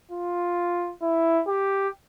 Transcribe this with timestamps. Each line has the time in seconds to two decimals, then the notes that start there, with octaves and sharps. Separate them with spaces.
0.11 F4
1.02 E4
1.47 G4